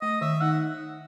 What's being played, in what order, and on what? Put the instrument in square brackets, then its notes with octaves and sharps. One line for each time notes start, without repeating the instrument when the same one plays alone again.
[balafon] A3 [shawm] D#5
[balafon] D#3 [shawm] E5
[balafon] D#4 [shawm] F#5